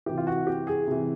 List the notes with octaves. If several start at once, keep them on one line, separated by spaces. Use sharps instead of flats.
C3 E3 G4
F4
F#4
G4
G#4
C3 E3